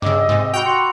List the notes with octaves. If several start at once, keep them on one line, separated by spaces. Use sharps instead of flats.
G2 C#3 D#5 D6 E6
G#2 C3
F#4 G5 B5 F7
F#4 C6 C#7